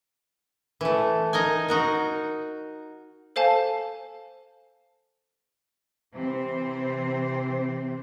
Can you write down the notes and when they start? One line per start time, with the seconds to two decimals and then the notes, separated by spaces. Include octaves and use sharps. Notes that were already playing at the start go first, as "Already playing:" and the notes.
0.81 E3 A3
1.33 D#4 A#4 D#5 G#5
1.68 D#4 F#4 A#4
3.36 A4 C5 F5 G#5 A5
6.13 C3 E3 C4 C5